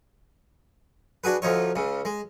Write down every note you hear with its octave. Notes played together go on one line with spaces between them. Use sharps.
D4 F#4 G#4 B4
D2 F3 D#4 C#5
C#2 C#3
G#3